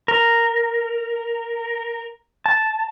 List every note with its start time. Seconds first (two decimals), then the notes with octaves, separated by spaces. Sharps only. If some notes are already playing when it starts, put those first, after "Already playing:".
0.08 A#4
2.46 A5